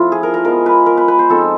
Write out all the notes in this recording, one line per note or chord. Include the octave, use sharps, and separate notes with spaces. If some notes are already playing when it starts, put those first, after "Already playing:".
Already playing: F3 A3 C4 E4 F4
G#4
A#4
A#4
F3 G#3 B3 A#4
B4
A#4
B4
B4
C5
F3 G#3 C4 D#4 A4